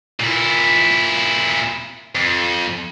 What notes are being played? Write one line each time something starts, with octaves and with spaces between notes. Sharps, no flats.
A#2 E4
F2